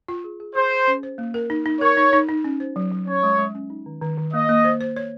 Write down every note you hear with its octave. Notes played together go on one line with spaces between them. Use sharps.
F4
G#4
G#4
G#4 C5
G#4
C#4
C5
A#3
A#4
D#4
D#4
A#4 C#5
D#4
D#4
D#4
C#4
C5
F#3
F#3
C#4 C#5
G#3
G#3
C#4
D#4
D#3
D#3
D#3
A#3 D#5
A#3
C5
C5
C#5